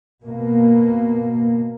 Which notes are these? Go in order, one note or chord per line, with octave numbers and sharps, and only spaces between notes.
B2 A#3